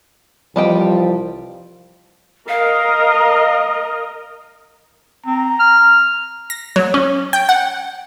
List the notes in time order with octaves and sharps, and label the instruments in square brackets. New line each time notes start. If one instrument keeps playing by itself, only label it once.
[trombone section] C2 E3 F3 [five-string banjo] G3 D#5 G5
[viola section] A#4 D#5 [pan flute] F5
[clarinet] C4 [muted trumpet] A#5
[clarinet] F6
[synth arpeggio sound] A#6
F#3
C#4
G5
F#5